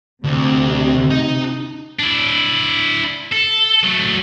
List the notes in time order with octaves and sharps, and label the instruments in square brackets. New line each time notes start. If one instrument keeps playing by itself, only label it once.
[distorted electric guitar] D2 [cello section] C3
[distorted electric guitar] D#4
D4 E4
A4
F#3 A3